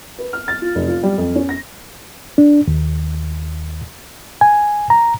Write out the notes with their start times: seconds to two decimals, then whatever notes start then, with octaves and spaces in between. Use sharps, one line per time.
0.19 B4
0.33 F6
0.48 A6
0.62 F4
0.75 F1
0.88 F4
1.03 G3
1.18 F2
1.35 C#4
1.49 A#6
2.38 D4
2.68 D#2
4.41 G#5
4.90 A#5